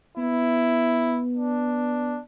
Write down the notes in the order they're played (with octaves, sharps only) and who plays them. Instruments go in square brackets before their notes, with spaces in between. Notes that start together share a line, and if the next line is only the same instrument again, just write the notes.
[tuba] B3 [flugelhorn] E4
[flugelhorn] D4